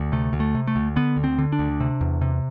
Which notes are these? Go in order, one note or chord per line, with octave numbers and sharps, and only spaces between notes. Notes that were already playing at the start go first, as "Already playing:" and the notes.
Already playing: D2
C3 A3
D2
A3
C3
A3
D2
D3 B3
D2
C4
D3
D4
D2
C3
E2
C3